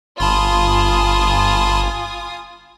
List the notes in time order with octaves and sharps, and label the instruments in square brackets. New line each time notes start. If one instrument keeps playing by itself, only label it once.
[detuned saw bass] G1 [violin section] F4 G#5 D#6 [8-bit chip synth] A5 B5 C6